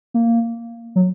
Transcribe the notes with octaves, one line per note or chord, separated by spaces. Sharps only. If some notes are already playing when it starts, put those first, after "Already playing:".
A#3
F#3